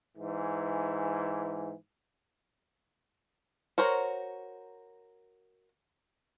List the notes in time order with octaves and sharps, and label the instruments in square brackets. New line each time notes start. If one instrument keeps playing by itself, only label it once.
[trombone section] G#2 E3
[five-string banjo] F#4 A#4 C5 C#5